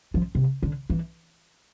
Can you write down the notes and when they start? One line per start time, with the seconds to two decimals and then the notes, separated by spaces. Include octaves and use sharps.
0.14 F3
0.35 C3
0.63 D3
0.90 E3